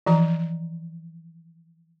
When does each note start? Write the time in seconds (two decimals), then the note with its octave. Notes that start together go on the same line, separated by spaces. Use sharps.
0.06 E3 F3 A#5